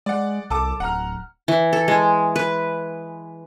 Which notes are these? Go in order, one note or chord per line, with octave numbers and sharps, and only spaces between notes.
G#3 D5 F#5
C2 A4 A5 D6
D1 F#5 A#5 F6
E3
A4
G#3
B4